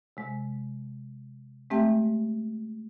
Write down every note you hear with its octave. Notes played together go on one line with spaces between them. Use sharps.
C3 G#3
G#3 A3 C4 G4 E5 G5